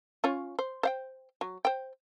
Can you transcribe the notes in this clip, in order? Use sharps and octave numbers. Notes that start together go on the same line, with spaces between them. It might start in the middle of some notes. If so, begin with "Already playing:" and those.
C#4 F4 C#5
C5
C5 F5 G5
F#3
C5 G5